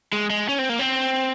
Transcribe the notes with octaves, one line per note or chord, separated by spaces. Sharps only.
G#3
G#3
C#4
C4
A#3
C4